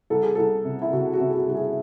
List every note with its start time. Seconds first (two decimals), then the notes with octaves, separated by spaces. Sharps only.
0.10 C2 A4
0.23 G#4
0.35 C2 A4
0.65 C3
0.82 E4
0.93 C3 F#4
1.13 F#4
1.20 C3
1.29 G#4
1.34 F#4
1.47 C2 F#4
1.55 G#4